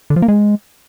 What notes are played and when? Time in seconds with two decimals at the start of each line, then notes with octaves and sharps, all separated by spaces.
0.10 D3
0.16 F3
0.22 A#3
0.28 G#3